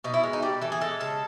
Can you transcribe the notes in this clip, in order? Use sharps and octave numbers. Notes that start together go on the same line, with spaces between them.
B2 D#4
E4
G#3
D#4
G3 D4
E3 A4
G#4
G#3 A4
C#3 A4